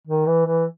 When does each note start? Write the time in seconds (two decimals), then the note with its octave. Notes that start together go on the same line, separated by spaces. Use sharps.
0.08 D#3
0.27 E3
0.46 E3